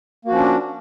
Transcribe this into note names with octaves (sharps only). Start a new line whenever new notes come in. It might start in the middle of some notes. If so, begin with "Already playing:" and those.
F3 A#3 C#4 D4 F#4